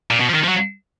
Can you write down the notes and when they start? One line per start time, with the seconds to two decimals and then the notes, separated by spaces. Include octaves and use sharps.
0.11 A#2
0.20 B2
0.29 F3
0.34 D#3
0.44 F3
0.48 F#3